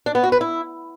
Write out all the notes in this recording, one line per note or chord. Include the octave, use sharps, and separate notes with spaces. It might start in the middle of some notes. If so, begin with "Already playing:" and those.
D4
B3
F#4
B4
E4